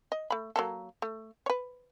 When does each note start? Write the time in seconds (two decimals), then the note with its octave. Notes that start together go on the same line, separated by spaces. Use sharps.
0.12 D#5
0.30 A3 B5
0.56 F#3 A#3 A4
1.02 A3
1.46 B4 C#5